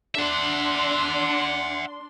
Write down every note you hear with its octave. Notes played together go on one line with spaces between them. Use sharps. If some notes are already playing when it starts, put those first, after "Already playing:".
D4 E5 F#5 C6